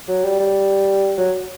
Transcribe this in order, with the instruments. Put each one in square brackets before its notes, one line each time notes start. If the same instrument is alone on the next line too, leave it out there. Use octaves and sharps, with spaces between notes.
[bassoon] F#3
G3
G3
F#3